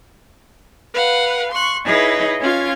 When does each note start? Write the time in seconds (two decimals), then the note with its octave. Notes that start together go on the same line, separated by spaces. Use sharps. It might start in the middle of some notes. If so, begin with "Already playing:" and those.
0.94 B4 F5 F#5
1.53 C6 C#6 F#6
1.85 D#4 E4 G#4 B4 C#5 D#5
2.41 C#4 F4 F5 G#6